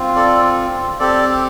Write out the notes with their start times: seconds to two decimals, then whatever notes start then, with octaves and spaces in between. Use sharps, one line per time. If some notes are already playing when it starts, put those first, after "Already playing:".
Already playing: C4 F4
0.16 A4 D5
1.00 C4 G4 A4 D5